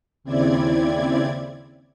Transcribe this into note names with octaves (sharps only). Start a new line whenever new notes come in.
D#2 C#3 C4 E4 D5 G#6